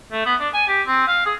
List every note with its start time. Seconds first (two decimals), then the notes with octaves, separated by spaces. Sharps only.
0.12 A3
0.26 B3
0.40 D4
0.54 G#5
0.68 G4
0.87 C4
1.08 F5
1.26 G#4